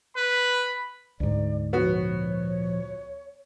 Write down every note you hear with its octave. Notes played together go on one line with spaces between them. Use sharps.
B4 B5
D2 G#2 D5
A#2 F3 B3 F#4 C#5